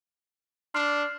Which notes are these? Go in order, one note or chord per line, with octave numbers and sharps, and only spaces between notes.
D4 C6 F6 C7